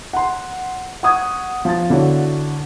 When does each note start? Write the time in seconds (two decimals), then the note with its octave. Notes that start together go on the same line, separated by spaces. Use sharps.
0.13 F#5 C6
1.03 F#5 C#6 D#6 G#6
1.65 F3 A6
1.90 D3 E4 F#4 C#5